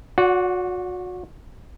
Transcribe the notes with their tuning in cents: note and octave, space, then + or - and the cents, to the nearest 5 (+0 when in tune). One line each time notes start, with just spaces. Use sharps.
F#4 -35 D5 -40 F#5 +0